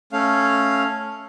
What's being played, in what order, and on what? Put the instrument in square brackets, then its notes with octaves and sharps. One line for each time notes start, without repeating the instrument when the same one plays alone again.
[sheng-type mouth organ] A3 C#4 F5